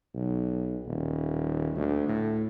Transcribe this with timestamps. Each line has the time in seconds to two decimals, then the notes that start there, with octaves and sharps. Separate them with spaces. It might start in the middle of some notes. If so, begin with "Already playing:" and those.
0.15 B1
0.86 D#1
1.76 D2
2.08 A2